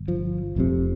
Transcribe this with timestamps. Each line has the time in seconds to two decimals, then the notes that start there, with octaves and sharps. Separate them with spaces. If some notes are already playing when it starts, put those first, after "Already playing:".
Already playing: G1
0.08 F3
0.56 F1 F2 C3